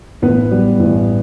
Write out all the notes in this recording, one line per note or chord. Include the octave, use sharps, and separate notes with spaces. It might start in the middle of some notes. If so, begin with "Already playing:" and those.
A1 B3 B4
G3
A1